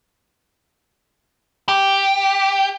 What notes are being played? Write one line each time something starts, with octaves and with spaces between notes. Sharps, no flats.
G4